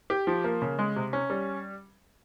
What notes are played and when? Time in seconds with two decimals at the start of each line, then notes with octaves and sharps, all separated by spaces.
0.10 G4
0.27 F3
0.44 A#3
0.62 C#3
0.79 G#3
0.96 C3
1.13 C#4
1.30 G3